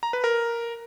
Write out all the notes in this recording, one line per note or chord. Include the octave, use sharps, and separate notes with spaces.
A#5
B4
A#4